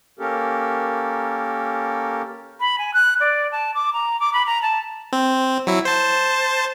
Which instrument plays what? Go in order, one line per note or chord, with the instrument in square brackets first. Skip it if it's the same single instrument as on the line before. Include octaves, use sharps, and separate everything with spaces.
[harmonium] A#3 C#4 G4 A4 A#4
[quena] B5
G#5
F#6
D5
A5
D6
A#5
D6
B5
A#5
A5
[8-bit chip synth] C4
F#3 E4
C5 A5